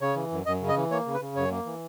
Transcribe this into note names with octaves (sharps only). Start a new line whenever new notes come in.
C#3 C#5
E3
F#2
F#2 D#5
C#3
D#5
E3
A#3 C#5
C#3
B4
C#3
F#2 C#5
A#3
E3